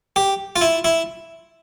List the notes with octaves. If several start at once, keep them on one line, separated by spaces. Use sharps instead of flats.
G4
F4
E4
E4